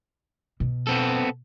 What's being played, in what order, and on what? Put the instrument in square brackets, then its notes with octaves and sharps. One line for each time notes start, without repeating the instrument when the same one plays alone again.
[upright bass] B2
[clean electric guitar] B3 C4 A4